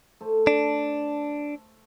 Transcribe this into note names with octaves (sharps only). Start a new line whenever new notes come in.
A3 A4 C5
D4